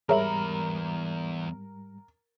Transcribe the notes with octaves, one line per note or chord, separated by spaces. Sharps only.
E2 G#2 G3 G#4 A#4 C#5 E5 B5